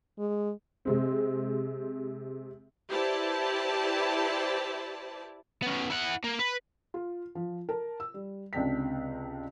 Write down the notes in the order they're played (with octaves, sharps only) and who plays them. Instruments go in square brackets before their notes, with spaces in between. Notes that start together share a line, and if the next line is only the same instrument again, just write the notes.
[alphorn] G#3
[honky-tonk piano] C3 G#3 C4
[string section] E4 G4 B4 C5 D5 A5
[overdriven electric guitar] B3 C#4
E4 F#5
A#3
B4
[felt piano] F4
F3
A#4 A5
E6
G3
C#2 C3 D4 G5 B6